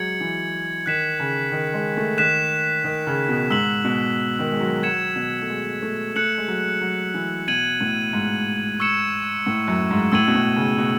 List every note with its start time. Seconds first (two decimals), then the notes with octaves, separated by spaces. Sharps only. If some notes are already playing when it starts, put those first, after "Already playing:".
Already playing: F#3 G#3 G#6 C#7 F#7
0.20 E3
0.86 D#3 F#6 B6 E7
1.20 C#3
1.52 D#3
1.74 G#3
1.97 A3
2.18 D#3 F#6 B6 E7
2.84 D#3
3.07 C#3
3.29 B2
3.50 G#2 E6 B6 F#7
3.84 B2
4.39 D#3
4.52 G#3
4.61 F#3
4.83 F#3 G#6 C#7 E7
5.16 B2
5.42 A3
5.49 G#3
5.82 A3
6.15 A3 F#6 C#7 F#7
6.38 G#3
6.48 F#3
6.81 F#3
7.14 E3
7.48 B2 G#6 D#7 F#7
7.81 A2
8.13 G#2
8.80 C#6 E6 G#6 C#7 E7
9.46 A2
9.68 F#2
9.91 G#2
10.12 A2 E6 G#6 D#7 F#7
10.27 B2
10.35 A2
10.56 C#3
10.78 B2